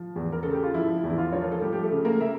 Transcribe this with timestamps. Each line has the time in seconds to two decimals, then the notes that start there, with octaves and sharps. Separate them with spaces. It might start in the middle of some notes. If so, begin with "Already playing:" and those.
Already playing: F3
0.16 E2
0.32 A#4
0.43 C#3 A4
0.53 G4
0.64 F4
0.74 F3 E4
1.04 E2
1.10 E4
1.18 F4
1.32 F3 C#5
1.42 A#4
1.52 A4
1.61 F3 G3 G4
1.73 G4
1.83 A3 A4
1.91 C#3
2.05 A#3 A#4
2.19 C#3 E5